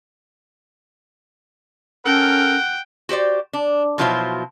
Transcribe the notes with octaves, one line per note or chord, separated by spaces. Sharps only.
C#4 A4 A#4 F#5 G5
F#4 G4 C5 D5
D4
B2 F3 F#3 E4 F4 C5